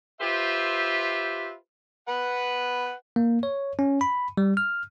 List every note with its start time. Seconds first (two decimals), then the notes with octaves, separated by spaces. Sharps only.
0.21 F4 G4 B4 C5 E5
2.08 B4 F#5
3.16 A#3
3.43 C#5
3.79 C#4
4.01 B5
4.37 G3
4.57 F6